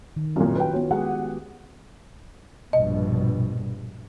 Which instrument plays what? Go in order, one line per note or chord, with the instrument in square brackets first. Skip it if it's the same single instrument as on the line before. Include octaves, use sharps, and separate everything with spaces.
[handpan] D#3
[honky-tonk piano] C2 F#2 A#2 [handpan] C#4 E4 F#4
[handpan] F4 [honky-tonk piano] B4 G5
[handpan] B3 F#4 [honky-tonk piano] C#4
[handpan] G#3 G4 G#4 [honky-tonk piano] F#5
[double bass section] A#1 G2 B2 [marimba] D#5